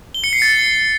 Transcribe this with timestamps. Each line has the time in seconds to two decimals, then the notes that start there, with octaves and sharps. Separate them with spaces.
0.14 G7
0.24 C#7
0.33 C7
0.42 A6